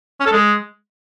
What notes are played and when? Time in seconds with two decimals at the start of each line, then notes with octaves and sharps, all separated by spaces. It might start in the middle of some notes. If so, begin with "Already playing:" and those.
0.20 C#4
0.26 A4
0.32 G#3